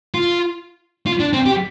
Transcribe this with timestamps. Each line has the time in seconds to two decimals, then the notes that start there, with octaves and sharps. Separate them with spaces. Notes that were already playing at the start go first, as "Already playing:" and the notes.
0.14 F4
1.06 F4
1.20 D4
1.33 C4
1.46 G4